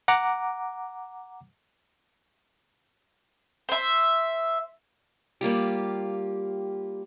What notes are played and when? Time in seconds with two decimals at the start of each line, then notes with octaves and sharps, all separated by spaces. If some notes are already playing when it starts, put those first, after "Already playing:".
0.08 F#5 A#5 D6
3.69 C5 E5
5.41 G3 A#3 F4 G4